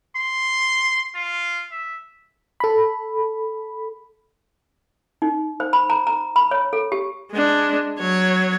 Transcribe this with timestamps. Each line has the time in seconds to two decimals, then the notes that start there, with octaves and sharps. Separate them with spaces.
0.17 C6
1.15 F4
1.72 E5
2.60 A4 B5
5.22 D#4
5.60 C5
5.73 B5
5.90 A#5
6.07 A#5
6.36 B5
6.51 C#5
6.73 A4
6.92 G4
7.31 G#3 D4
7.99 F#3 C#5